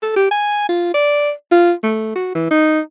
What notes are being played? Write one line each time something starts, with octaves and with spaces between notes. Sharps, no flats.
A4
G4
G#5
F4
D5
F4
A3
F#4
E3
D#4